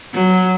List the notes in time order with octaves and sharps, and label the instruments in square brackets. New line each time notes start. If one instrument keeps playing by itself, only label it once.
[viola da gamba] F#3